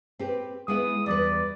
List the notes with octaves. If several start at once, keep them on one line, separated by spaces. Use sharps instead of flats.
C4 G4 B4
G#3 B3 E4 D#6
E2 G3 B4 D5